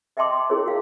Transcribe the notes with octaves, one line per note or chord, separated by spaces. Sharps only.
D#5 E5 G5 A5 C6 D6
C#4 E4 G#4 A#4 C#5
F#4 F5 G5